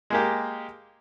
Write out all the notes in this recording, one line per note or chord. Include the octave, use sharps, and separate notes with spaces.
G#3 A#3 G4